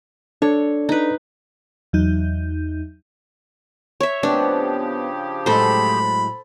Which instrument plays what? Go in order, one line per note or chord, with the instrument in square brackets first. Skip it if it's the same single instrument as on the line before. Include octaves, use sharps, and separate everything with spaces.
[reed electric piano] D4 A4 D5 [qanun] C#5
[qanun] D#4 B4
[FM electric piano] E2 F#3 D#4 G6
[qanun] C#5 E5
[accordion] C#3 F3 G4 [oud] B3 C4 [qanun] D4
[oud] A2 F#3 G#3 [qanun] A4 C5 [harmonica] B5